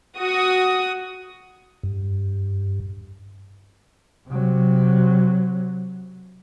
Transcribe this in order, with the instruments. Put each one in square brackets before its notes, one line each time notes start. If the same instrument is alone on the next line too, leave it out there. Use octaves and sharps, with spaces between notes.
[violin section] F#4 D#6
[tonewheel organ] G2
[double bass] C3 F#3